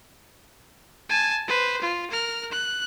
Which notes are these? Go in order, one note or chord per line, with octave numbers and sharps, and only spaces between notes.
G#5 A5
B4 C5
F4
A#4 F6
F#6